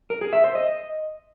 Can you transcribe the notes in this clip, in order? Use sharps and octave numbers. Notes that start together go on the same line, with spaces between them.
A#4
G#4
E5
C5
D#5